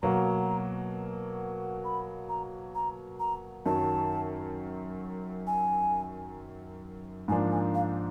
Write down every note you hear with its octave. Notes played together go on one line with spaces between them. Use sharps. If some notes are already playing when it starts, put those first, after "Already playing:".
B2 F#3 A#3 A#5
B5
A#5
A#5
A#5
F#2 D#3 F#3 A5
G#5
G#2 F3 A#3 D4 G#5
G#5
F5